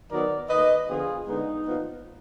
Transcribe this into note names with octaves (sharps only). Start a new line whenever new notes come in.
D#3 F#3 B3 A#4 D5
D#3 A#3 B4 D#5
D3 F3 B3 F4 G#4
D3 G#3 B3 D#4
A#2 F3 B3